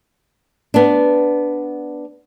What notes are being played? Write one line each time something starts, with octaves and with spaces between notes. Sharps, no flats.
B3 D4